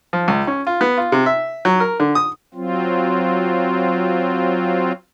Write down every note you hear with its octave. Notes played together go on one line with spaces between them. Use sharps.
F3
C#2
C#4
F4
B3
F4
C3
E5
F#3
A#4
D3
D#6
F#3 C4 F4